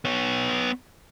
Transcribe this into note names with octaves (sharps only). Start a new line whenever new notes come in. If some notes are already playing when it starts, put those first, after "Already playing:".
B3 C#5